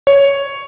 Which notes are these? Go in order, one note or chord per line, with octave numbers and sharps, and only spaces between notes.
C#5